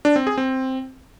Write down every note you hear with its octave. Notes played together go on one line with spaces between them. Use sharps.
D4
C4
G#4
C4